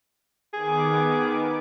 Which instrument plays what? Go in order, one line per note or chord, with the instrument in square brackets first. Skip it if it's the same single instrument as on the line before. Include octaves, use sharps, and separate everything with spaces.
[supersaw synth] D#3 B3 D6 [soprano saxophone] G#4